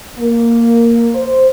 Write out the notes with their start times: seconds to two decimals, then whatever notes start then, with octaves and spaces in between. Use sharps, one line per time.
0.19 A#3
1.15 C5